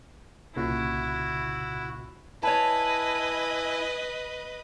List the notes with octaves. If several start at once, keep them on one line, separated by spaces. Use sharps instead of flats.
C2 A#2 C#3 E4 F#4
E4 B4 C#5 D#5 G#5 A5